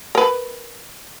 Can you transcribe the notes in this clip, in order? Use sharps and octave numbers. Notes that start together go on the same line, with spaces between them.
A#4 B4